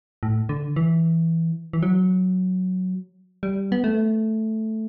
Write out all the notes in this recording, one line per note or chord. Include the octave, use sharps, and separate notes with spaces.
A2
D3
E3
E3
F#3
G3
B3
A3